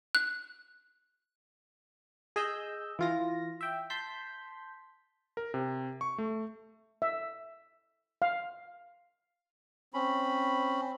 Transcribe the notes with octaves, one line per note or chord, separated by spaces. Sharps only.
F#6
G#4 D#5 E6 G6
E3 F4 A#6
E5 G5
A5 C6 G6 B6
A#4
C3
C#6
A3
E5
F5
C4 C#4 B5